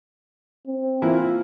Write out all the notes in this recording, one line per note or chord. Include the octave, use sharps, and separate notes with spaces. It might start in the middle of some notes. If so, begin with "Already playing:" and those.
C4
E3 A#3 E4 F4